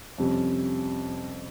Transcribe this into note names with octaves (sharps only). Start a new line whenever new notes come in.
F2 C3 G3 C#4